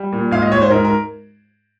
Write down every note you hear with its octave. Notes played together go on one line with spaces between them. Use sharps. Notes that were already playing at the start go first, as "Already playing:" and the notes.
Already playing: G3
A#2
G#2 F5
D#5
G#2 C#5
C5
G#2 A#4
A#4